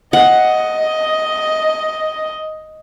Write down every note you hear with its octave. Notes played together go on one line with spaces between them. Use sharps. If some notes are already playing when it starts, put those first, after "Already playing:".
D#5 F#5